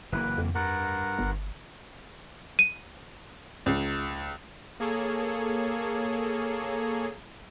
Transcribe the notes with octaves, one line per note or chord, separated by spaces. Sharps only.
F#1 E3 A#3 B4
F2
G2 A#4 F#5
G1
D#7
C#2
A#3 G#4 A4 C#5